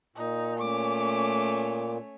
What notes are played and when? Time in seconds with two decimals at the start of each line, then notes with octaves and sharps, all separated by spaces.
0.16 A#2 D#4
0.59 A3 C#4 D6